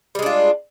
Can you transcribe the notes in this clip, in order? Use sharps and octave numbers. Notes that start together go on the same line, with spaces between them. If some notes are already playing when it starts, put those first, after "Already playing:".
G3 G#3 D4 F4